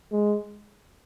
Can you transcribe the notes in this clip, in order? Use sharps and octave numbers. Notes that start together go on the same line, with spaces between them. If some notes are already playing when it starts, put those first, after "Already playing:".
G#3